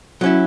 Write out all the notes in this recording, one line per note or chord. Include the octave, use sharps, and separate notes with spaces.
F#3 C#4 E4